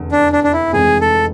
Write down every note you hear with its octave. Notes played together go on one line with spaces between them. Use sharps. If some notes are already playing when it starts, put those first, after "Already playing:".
Already playing: F1 E2 D3
D4
D4
D4
E4
F1 F2 E3 G#3 C4 G#4
A4